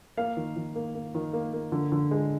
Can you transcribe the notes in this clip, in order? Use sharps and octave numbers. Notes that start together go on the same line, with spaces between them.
A#3 F5
D#3
D#3
A#3
A#3
D#3
A#3
A#3
D3
D3
G#3